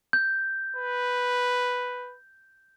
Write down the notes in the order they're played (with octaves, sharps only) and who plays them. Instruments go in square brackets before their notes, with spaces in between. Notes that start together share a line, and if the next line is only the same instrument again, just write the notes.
[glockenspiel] G6
[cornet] B4